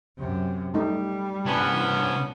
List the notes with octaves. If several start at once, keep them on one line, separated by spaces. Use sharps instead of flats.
F#2 C3
G3 A3 D#4
C2 B3 C#4 D4